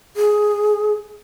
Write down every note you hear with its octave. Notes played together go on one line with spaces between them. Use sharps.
G#4